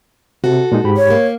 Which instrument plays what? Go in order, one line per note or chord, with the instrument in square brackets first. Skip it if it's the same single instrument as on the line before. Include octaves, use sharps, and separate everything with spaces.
[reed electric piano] C3 [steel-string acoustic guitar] F#4 A4
[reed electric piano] A#2 G#3 D#4
G#2 G4 B5
[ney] C#5
[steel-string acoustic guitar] A#3